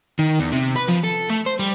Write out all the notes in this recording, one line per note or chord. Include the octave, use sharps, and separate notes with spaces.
D#3
E2
C3
B4
F3
A4
A3
C5
G3